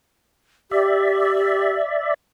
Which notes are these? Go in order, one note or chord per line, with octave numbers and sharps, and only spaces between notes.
G4 D5 E5